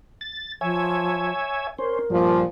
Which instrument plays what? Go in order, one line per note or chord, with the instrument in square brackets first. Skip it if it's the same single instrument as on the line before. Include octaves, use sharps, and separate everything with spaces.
[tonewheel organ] A6
[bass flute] F3 [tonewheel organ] C#5 E5 G#5
[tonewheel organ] C#4 C5 [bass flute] A#4
[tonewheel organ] G2 [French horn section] A#2 F3